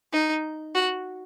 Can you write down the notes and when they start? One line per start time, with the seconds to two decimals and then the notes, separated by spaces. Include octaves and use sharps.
0.13 D#4
0.75 F#4